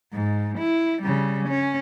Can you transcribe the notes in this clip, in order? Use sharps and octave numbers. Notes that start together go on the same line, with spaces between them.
G#2
E4
C#3 G3
C#4